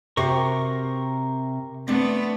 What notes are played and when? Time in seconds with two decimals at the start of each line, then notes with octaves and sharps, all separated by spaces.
0.17 C3 F#4 G4 A#4 C5 C#6
1.88 A3 B3 C4 D4